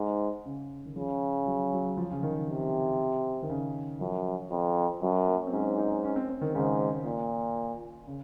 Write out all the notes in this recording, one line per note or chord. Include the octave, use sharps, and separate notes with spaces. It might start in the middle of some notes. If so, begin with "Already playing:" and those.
Already playing: G#2
C#3
D#3
C#3 F3
F#3
F#3
F3
C#3
D#3
C3
D#3
C#3
F#2 F3
F2
F#2 F#3
A#3
C4
G#2 C#4
D#4
C#4
C4
C4
D#3
G#2 C#3
A#2
C#3